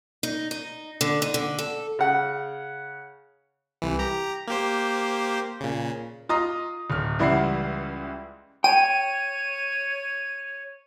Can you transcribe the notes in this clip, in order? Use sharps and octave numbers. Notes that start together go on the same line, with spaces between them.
D#4
D#4
D3
D#4
D3
A4
C#3 F#5
C2 E3
G4 A#5
A#3 G4 C5
A#2 C#3
F4 D#5 A#5 D#6
D1 F6
C#2 E3 G3 E4 F#5 C7
C#5 G5 D#7